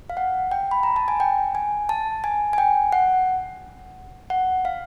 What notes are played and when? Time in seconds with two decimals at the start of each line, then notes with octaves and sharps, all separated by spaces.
0.10 F5
0.17 F#5
0.51 G5
0.71 B5
0.83 A#5
0.96 A5
1.08 G#5
1.20 G5
1.55 G#5
1.89 A5
2.24 G#5
2.53 G#5
2.58 G5
2.92 F#5
4.30 F#5
4.65 F5